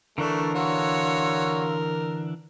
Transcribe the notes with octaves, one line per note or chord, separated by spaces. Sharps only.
D3 E3 A3 D4 A#4 D5 C#6
F#4 C#5 F5 C6 E6